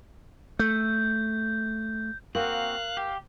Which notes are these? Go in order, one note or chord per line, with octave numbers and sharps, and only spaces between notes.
A3 G6
A#3 C4 F#4 A#4 F5 F#6
G4